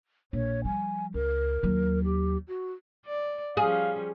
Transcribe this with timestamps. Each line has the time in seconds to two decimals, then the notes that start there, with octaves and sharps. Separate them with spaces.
0.33 A#1 C#5
0.65 F3 G3 G#5
1.14 C#2 A#4
1.63 D#2 F#3
2.05 G4
2.48 F#4
3.06 D5
3.57 F3 G3 C#4 G#4 F5